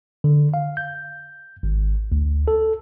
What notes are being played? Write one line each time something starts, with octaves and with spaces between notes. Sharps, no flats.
D3
F5
G6
G#1
D2
A4